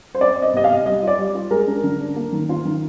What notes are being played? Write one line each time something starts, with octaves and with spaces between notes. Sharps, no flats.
C5
C4 D5
C4
D#5
C3 D#5
F5
C3
G3 D#5
F4 D5
G3
F4
G#3 A#4
D4
D3
D4
A#3
D#3
F4
D#3